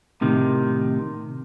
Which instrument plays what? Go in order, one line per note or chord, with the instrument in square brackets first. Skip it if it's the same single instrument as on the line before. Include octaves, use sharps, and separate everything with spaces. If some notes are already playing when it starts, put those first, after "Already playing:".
[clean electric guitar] A2 C3 D#3